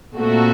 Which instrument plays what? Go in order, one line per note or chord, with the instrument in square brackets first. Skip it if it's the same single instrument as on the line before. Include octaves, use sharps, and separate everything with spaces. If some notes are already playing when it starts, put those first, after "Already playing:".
[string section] A#2 A3 C4 F#4 A4